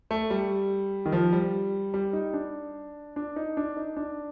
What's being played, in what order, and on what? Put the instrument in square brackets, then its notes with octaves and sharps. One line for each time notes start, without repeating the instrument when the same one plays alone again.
[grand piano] A3
G3
D#3
F3
G3
G3
D#4
D4
D4
D#4
D4
D#4
D4